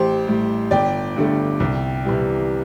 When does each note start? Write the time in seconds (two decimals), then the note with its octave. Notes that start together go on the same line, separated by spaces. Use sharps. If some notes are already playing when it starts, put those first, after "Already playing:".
Already playing: A1 G4 C5
0.27 A2 G3
0.71 G1 D5 G5
1.17 G2 D3 A3
1.60 C2
2.05 C3 E3 G3